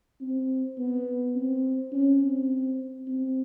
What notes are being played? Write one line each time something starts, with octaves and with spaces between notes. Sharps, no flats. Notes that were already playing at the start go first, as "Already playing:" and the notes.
C4
B3
C4
C#4
C4
C4